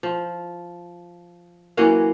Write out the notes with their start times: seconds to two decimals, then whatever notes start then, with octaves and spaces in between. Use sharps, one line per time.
0.03 F3
1.77 E3 F#3 A#3 C#4